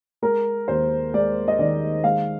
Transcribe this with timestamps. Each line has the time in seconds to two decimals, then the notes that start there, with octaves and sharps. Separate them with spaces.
0.22 G#3 A#4
0.68 D#2 C5
1.14 G#3 D5
1.48 D#5
1.59 D#3 D5
2.04 G#3 F5